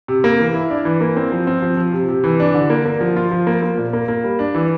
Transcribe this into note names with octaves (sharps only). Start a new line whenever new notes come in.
C3
A#3
E3
E4
D4
E3
A#3
C4
F3
C4
F3
F3
C3
C3
E3
D4
D3
A#3
A#3
F3
F4
F3
A#3
A#3
A#2
A#3
A#3
G3
D4
E3